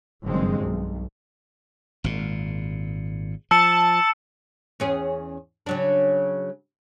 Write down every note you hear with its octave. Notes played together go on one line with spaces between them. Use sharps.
F#1 G2 D#3 G#3 C4
B1
G#1 A#2
F3 A5 E6 C#7
E2 C#4 G#4
C#3 F#3 D4